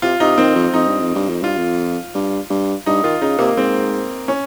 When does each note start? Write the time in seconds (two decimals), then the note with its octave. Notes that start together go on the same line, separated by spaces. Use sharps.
0.02 C3 F4
0.20 C3 D#4
0.38 D#3 C4
0.55 F2
0.73 F2 D#4
0.87 G2
1.01 F2
1.15 G2
1.29 F2
1.42 G2 F4
1.57 F2
2.15 G2
2.50 G2
2.86 G2 D#4
3.03 D#3 F4
3.21 C#3 D#4
3.38 C3 A#3
3.57 G#2 C4
4.28 C#4